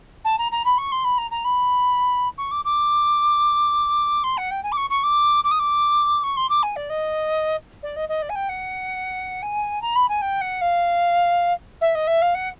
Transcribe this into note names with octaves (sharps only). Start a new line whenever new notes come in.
A5
A#5
A#5
B5
C#6
C6
B5
A#5
A#5
B5
C#6
D6
D6
C6
F#5
G5
G#5
D6
C#6
C#6
D6
D6
D#6
D6
C#6
C6
D6
G#5
D5
D#5
D5
D#5
D#5
D5
G#5
G5
F#5
G#5
A#5
B5
G#5
G5
F#5
F5
E5
D#5
E5
F5
F#5